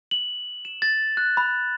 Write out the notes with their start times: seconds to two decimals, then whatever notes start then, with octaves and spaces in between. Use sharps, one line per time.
0.11 F#7
0.65 E7
0.82 A6
1.17 F#6
1.37 B5